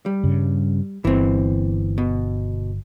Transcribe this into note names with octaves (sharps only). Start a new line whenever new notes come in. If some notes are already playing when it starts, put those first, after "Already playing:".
G3
G2 C#3
G1 E3 C4
B2